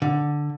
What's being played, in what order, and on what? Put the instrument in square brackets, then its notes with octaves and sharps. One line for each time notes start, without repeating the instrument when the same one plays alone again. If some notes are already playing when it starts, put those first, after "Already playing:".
[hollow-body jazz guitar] D3